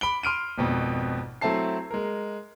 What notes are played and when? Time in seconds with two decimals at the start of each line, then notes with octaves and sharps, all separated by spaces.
0.01 B5 D7 G7
0.23 C6 F6 D7 D#7
0.58 G#1 F2 B2
1.41 F#3 A3 C4 E4 A5 C7
1.91 G#3 A#4